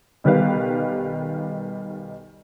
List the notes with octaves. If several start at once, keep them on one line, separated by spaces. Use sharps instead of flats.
B1 D#3 G3 G4 B4 F5